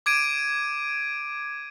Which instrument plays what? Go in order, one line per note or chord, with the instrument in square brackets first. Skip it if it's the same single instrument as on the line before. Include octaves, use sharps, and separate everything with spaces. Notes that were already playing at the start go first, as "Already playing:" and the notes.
[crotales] D6 G#6 D7 D#7